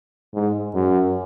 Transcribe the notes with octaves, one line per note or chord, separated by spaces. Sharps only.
G#2
F#2